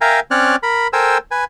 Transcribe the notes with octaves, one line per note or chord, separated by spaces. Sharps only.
A#4 E5 F5 G5 G#5 A#5
C4 C#4 C#5 D5 F6 F#6
A#4 B5
A4 A#4 C5 G5 G#5 E6
B4 G#5